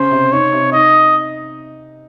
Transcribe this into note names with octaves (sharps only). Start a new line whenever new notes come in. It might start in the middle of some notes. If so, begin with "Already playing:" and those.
Already playing: C#3 C#4 C5
C3
D#4 C#5
C3
D#4 D#5